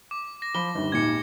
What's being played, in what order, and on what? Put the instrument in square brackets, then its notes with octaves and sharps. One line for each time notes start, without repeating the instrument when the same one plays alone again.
[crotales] D6
A#6
[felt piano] F3 B5 [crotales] G7
[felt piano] G1 D#2
[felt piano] G#1 D#2 A#2 [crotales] G#6 C#7